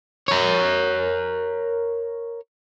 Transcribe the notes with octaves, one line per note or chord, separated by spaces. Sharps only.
A#4 C#5